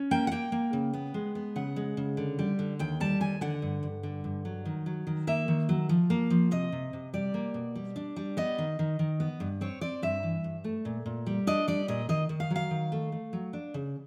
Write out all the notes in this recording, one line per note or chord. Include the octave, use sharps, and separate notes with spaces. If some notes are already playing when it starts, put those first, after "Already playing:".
Already playing: C#4
A#3 G5
F#5
A#3 G5
A#3
C#3
B3
G#3
B3
C#3 F#5
G#3
C#3
D3
G3
D3
D#2 G5
G3 A5
D#2 G#5
D3 F#5
G2
G2
D3
G2
F#3
D#3
F#3
D#3
A#3 E5
D#3
F#3
F3
A#3
F3
C3 D#5
C3
C3
G3 D5
A#3
B2
G3
D4
G3
B3 D#5
D#3
D#3
D#3
B3
G2
C4 C#5
C4 D5
G2 E5
E3
G2
A3
A#2
A#2
G3
D4 D#5
G3 D5
A#2 D#5
D#3 D#5
D#3
F5
F#3
F5
D#3
A3
A3
F#3
D4
C#3